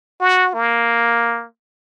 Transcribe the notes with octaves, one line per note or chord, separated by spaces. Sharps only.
F#4
A#3